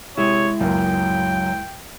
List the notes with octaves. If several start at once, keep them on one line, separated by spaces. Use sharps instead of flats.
C3 G#3 E4 C#5
C#2 F#2 F#3 A#3 G5